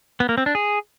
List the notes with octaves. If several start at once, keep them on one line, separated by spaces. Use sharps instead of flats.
B3
A#3
C4
D4
G#4